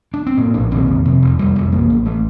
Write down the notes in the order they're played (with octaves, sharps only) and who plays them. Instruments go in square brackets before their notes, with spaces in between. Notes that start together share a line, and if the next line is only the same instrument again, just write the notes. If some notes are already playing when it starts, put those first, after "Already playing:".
[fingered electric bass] D4
C4
A2 A#3
A#1 D4
D#2 C4
F1
C3
F1
F1 G3
F1
A1 A#3
A1
A3